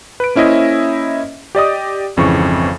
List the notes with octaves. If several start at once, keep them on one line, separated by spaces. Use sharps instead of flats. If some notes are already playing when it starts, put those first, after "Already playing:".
B4 D7
A#3 C#4 E4 C5 D#5 E5
G4 D5 D#5 D#6
G#1 F2 C#3 E3 C#6